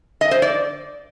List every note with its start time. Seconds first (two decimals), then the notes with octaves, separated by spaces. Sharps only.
0.21 D#5
0.31 C5
0.42 D5